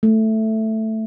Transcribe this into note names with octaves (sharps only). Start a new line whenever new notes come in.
A3